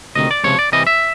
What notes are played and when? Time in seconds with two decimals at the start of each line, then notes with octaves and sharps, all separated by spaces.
0.15 D2 C3 D#3 D#5
0.31 D5
0.44 C#2 C3 F3 C#5
0.59 D5
0.72 C3 E3 G3 D#5
0.87 E5